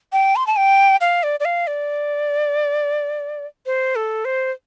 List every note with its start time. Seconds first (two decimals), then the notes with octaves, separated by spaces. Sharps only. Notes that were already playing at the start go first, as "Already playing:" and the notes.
0.13 G5
0.36 C6
0.47 A5
0.57 G5
1.01 F5
1.23 D5
1.40 D5
1.45 F5
1.67 D5
3.66 C5
3.96 A4
4.25 C5